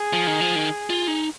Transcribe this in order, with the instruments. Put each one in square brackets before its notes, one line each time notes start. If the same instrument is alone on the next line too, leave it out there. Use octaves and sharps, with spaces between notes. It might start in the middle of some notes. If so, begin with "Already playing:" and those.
Already playing: [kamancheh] G#4
[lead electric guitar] F3
D#3
F3
D#3
F4
D#4